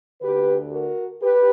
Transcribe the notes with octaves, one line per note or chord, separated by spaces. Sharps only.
D2 D3 G4 B4
F#4 A#4
G4 B4